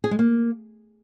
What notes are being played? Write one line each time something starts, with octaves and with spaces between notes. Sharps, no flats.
G#4
G#3
A#3